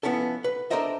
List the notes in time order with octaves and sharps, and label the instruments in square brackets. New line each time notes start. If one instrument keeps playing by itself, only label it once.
[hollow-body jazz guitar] F3 B3 C#4 E4 A4
B4
D4 A4 A#4 C5 D#5 E5